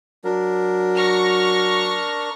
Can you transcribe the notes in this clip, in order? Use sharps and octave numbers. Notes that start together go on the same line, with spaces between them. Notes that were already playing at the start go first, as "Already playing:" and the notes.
F#3 D4 A#4
C#6 F6 A#6